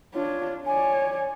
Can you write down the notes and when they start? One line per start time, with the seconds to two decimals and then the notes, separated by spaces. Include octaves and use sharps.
0.14 D4 F4 C#5
0.66 C#5 D5 G#5